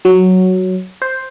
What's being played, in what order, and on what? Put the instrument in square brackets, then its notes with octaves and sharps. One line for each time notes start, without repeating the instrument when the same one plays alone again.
[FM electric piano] F#3
C5